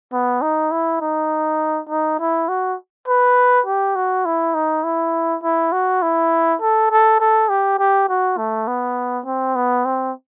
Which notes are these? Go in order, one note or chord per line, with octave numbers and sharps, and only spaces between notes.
B3
D#4
E4
D#4
D#4
E4
F#4
B4
G4
F#4
E4
D#4
E4
E4
F#4
E4
A4
A4
A4
G4
G4
F#4
A3
B3
C4
B3
C4